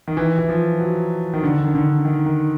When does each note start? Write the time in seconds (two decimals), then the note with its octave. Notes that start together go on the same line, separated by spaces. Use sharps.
0.08 D#3
0.17 E3
0.39 E3
0.49 F3
0.80 F#3
1.34 D#3
1.43 D3
1.64 D#3
1.75 D3
2.05 D#3
2.26 D#3